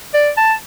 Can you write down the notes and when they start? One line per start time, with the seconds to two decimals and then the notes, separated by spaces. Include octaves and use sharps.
0.14 D5
0.37 A5